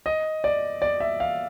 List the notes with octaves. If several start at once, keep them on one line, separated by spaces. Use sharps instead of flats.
D#5
D5
D5
E5
F5